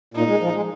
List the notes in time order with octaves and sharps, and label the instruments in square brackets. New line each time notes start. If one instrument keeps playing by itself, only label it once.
[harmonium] A#2 [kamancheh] D#4
[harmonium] G#3
F3
G#3